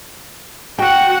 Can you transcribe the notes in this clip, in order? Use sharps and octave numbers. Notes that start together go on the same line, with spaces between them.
F#4 F#5 G5